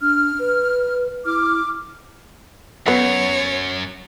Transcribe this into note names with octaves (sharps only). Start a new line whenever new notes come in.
D4 F6
B4
E4 D6 F6
F#2 F#3 B3 C#5